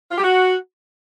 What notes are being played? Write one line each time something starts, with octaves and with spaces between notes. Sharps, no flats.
F4
G4
F#4